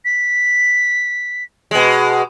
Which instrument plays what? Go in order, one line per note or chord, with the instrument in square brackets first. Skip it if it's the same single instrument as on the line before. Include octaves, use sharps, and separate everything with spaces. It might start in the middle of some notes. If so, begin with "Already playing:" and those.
[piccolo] B6
[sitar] B2 G#3